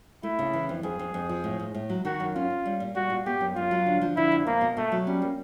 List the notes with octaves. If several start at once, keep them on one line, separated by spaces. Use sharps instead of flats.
A3 E4
C#3
E3
F2
F2 G#4
F2
F2
F3
A2
A2
A2
F#3
D#3 F#4
F#2
C#4 F4
C#4
G3
A#2
G3 F#4
A#2
B3 G4
F#2
F#2 F4
F#3
D3
F3
D3 E4
F2
B2 A#3
B2
B2 A3
F#3
G3 C#4
A#3